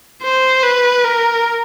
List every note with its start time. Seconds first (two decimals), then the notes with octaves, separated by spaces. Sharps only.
0.23 C5
0.64 B4
1.05 A#4